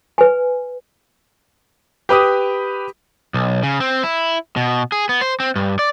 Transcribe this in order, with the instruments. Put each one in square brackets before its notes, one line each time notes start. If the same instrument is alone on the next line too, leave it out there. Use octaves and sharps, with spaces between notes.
[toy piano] B4 G#5
[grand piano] G4 B4 D6 D#6
[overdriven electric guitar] B1
C#3
C4
E4
B2
G#4
B3
C5
C4
G2
D5